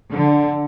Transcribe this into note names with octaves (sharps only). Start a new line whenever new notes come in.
D3